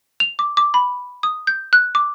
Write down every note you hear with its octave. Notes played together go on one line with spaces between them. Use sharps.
F7
D6
D6
B5
D#6
G6
F#6
D6